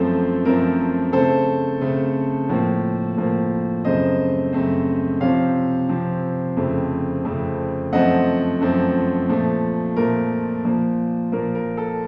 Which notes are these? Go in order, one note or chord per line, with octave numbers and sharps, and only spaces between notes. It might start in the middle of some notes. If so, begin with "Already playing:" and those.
Already playing: F#2 F3 A3 C4 A4 C5
F#2 F3 A3 C4 A#4
C#3 A3 C4 A4 C5
C#3 A3 C4
A2 F3 A#3
A2 F3 A#3
F#2 C#3 A3 C4 C5 D#5
F#2 C#3 A3 C4
C3 F3 C4 C#5 F5
C3 F3 C4
F2 C#3 A3 C4
F2 C#3 A3 C4
F#2 F3 A3 C4 D#5 F#5
F#2 F3 A3 C4
A#2 F3 A3
A#2 F3 A3 A#4
A#2 F3 A#3
A#2 F3 A#3 A#4
A#4
A4